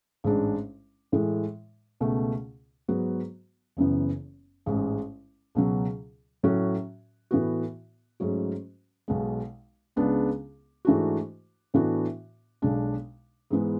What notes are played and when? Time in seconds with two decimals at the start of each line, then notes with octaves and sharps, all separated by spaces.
0.24 A1 G#2 G#3 D4
1.12 A2 E3 G#3
2.00 C#2 B2 A3
2.88 G#2 F#3 B3 F#4
3.77 F#1 F#2 E3 B3
4.66 A1 G#2 G#3
5.55 C#2 B2 F#3
6.43 A2 F#3 C#4 F#4
7.31 A2 E3 B3 F#4
8.20 G#2 F#3 A3 C#4 F#4
9.08 B1 B2 G#3
9.96 C#2 C#3 G#3 B3 D4
10.85 G#2 E3 A3 D4 F#4
11.74 A2 E3 B3 D4 F#4
12.62 B1 B2 G#3 D4
13.50 G#2 E3 G#3 B3